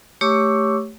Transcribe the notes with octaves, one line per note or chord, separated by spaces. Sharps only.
A3 G4 C#5 C#6 D6 E6